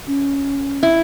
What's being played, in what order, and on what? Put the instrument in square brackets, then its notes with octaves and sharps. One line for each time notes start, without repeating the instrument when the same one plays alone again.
[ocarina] C#4
[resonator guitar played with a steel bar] E4